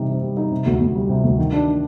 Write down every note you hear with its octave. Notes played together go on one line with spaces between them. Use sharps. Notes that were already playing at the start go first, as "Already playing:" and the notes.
Already playing: C3 G3 D#4
C4
G3
D#4
C3
D2
D2
G3
C3
D2
D#3
D4